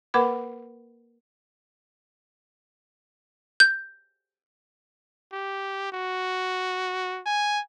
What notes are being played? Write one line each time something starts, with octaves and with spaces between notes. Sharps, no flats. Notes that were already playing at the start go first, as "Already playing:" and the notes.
A#3 A#4 B4 F#5 B5 D6
G6
G4
F#4
G#5